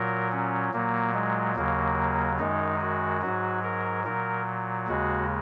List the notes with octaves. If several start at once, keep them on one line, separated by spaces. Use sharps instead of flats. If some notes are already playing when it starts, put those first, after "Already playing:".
Already playing: A#2 F#3 A#4
C#4
A#2 F#3 A#3
G#3
D#2 C#3 F#3 A#3
F#2 D#3 G#3 D#4
F#4
G#2 F#3 F#4
A#4
A#2 F#3 A#4
D#2 C#3 G#3 F#4